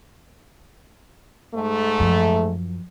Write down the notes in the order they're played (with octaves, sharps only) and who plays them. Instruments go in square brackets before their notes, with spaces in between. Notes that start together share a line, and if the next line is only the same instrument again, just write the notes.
[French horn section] G#2 A3
[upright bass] F#2 F3